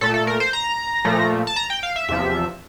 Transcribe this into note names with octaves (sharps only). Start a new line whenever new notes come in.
A#2 A3 A4
A4
A#4
C5
A#5
A#2 F3 A3
A5
A#5
G5
F5
E5
E2 C3 F3 E5